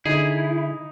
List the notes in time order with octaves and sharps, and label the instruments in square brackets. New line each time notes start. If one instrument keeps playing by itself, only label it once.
[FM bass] D3 [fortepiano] D#4 [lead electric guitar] E4 [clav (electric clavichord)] G#4